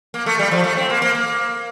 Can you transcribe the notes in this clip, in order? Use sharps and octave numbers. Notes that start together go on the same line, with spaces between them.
A#3
A3
G3
F3
A3
C4
A#3
A#3
A#3